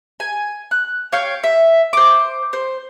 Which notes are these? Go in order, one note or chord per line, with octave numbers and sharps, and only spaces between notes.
G#5
F#6
C#5 F5 G5
E5
C5 D6
C5